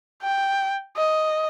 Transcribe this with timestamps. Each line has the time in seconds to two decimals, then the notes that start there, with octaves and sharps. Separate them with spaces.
0.22 G5
0.96 D#5